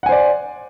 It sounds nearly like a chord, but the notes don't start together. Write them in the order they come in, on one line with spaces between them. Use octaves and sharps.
F#5 G#5 C5 D5